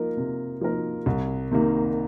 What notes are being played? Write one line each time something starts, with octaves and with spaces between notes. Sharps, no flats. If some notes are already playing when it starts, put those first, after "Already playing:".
Already playing: F3 A#3 D#4 A#4
C3
F3 A#3 D#4 A#4
C2
C3 D#3 A#3